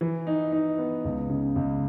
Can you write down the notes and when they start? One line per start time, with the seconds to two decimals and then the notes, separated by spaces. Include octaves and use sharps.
0.01 E3
0.27 D#4
0.52 D#4
0.79 B3
1.05 C#2
1.30 C#3
1.56 C#2